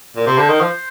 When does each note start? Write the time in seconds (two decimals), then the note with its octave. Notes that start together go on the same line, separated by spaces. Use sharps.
0.16 A#2
0.27 C3 C5
0.38 D3
0.49 D#3
0.61 F3